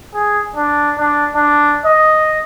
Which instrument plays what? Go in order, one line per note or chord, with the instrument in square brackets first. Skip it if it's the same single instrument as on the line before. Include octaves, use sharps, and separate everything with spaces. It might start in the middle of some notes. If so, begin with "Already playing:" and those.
[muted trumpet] G#4
D4
D4
D4
D#5